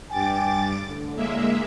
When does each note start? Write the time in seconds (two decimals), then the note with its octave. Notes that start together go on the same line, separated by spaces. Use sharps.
0.10 G2 G5 G#5 D6 A6
0.86 A2 D3
1.16 G#3 A#3 E5